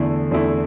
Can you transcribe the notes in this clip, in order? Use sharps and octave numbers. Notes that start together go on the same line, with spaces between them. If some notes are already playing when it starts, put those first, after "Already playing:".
Already playing: E2 D3 A3 E4
E2 D3 A3 E4